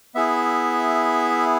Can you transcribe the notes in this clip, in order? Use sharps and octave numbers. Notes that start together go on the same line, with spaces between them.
B3 E4 G#4 E5